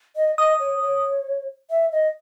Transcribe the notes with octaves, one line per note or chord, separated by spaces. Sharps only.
D#5
D#5 D#6
C#5
C#5
E5
D#5